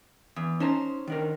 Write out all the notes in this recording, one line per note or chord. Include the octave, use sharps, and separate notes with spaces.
E2
C#4 D#4 C5 A5 A#5
D#3 D4 A#4